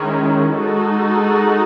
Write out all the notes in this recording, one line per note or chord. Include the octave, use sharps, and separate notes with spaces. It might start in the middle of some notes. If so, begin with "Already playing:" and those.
Already playing: D#3 G#3 C#4 E4
G#3 D#4 F#4 A4